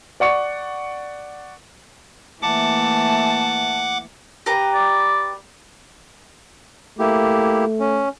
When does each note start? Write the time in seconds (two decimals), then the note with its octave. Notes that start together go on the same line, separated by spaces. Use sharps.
0.20 D5 F#5 C#6 C#7
2.42 E3 A3 A#3 F#5 A5 D6
4.46 G4 B4 A#5
4.74 D5
6.99 A3 A#3 E4 G4
7.80 C#4